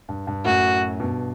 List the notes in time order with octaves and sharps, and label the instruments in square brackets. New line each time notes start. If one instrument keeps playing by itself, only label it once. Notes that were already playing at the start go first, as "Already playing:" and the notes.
[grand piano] G2
G2
[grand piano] F#2 A2 [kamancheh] F#4
[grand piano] G2 B2